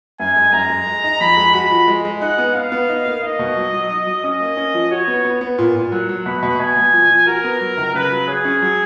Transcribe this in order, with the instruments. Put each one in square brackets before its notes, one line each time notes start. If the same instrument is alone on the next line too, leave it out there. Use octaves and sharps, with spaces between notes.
[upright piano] F#2 [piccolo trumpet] G#5
[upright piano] G#3
[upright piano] F#2 [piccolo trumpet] A#5
[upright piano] G#3
G#3
D#4
[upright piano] F2 [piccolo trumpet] B5
[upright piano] G#3
[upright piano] F#4 [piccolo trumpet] B5
[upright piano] F3
G#3
G#3
[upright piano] D#4 [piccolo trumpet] F#5
[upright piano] B3
[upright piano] B3 [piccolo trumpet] F5
[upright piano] B3
D#4
A#3
[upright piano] D#4 [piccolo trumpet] D#5
[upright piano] B2
F#3
F#3
D#4
F#3
[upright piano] C#4 [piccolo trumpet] D#5
[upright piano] A#3
C#4
F3
[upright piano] F#4 [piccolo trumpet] C#5
[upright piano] B3
B3
B3
A#2
A#2
[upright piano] F#3 [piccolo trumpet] F#5
[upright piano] F#3
[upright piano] B2 [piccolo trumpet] B5
[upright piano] B2
[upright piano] B2 [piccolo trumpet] G#5
[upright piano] B2
F3
F3
[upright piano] F#4 [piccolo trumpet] A#4
[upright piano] B3
F#3
C#2
[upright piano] C#3 [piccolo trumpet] B4
[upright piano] F#3
[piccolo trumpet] G#4 [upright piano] C#5
[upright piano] C#4
F#3